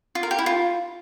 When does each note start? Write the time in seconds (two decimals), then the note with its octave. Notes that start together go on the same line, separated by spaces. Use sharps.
0.15 F4
0.23 A#4
0.31 G4
0.39 E4
0.46 F4